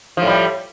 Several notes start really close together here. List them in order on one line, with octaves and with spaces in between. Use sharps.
F3 A2 G3